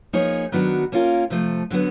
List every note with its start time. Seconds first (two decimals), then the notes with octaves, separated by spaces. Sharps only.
0.13 F3 A#3 D#4 G#4 C#5
0.52 D#3 F#3 B3 D4 F#4
0.92 A#3 C#4 F4 A#4
1.30 C3 F3 A3
1.70 D3 F#3 B3